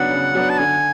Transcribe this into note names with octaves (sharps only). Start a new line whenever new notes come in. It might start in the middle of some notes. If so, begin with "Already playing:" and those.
Already playing: C#3 F#3 B3 D4 F#5
C#3
F#3 B3 D4
A5
D3 G#5